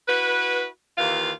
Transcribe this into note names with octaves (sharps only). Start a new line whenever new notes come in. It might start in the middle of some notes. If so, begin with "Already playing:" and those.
E4 F#4 B4
D#2 D#3 E3 F4 F5